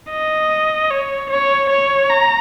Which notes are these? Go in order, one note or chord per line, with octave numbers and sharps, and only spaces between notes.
D#5
C#5
C#5
C#5
A#5